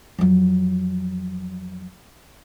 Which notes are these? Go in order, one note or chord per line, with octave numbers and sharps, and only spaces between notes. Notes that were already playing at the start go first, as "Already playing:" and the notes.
F2 F#3